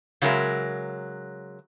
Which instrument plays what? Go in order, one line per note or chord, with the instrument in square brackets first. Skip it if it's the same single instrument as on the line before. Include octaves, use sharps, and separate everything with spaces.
[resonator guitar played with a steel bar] C#3 F#3 G#3 A#4 E5